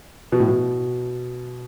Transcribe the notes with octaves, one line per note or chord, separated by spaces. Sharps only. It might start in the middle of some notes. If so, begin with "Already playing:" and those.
B2
A2
B2